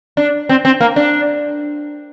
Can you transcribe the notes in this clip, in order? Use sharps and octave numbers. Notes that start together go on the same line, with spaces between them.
D4
C4
C4
A#3
D4